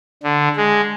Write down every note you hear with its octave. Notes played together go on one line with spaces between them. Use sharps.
D3
G#3